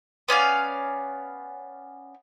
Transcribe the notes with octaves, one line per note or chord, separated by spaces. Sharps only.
B3 C#4 D5 F5